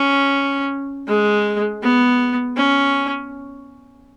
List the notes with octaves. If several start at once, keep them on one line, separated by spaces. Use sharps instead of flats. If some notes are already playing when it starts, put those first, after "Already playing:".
Already playing: C#4
G#3
B3
C#4